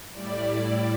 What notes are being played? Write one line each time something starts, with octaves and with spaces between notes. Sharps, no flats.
A2 G3 E4 D5
D5